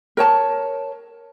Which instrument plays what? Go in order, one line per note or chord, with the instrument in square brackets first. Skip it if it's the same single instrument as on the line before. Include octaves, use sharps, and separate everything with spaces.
[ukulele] A#4 C#5 A5